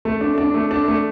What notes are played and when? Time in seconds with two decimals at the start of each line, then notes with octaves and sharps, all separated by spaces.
0.05 A3
0.21 D4
0.38 D4
0.54 A3
0.71 D4
0.88 A3